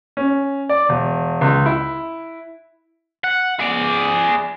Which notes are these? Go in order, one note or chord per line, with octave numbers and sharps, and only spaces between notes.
C#4
D5
E1
C#2
E4
F#5
G#4 D5